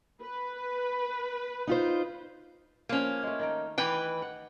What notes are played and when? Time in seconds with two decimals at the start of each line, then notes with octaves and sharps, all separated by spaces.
0.21 B4
1.67 D#4 F4 C5
2.89 F3 A#3 C#4 C5 F5
3.23 G#3 A3
3.39 D#3 D#4 G5
3.78 E3 G4 B4 G5
4.22 F#5